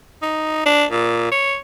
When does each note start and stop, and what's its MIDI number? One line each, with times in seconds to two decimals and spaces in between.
0.22 0.65 63
0.66 0.85 62
0.91 1.28 46
1.32 1.57 73